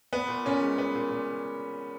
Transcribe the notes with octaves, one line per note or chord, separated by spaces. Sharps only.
B3
A#2
A#2 C#4
G#3
B3
A#2
A#2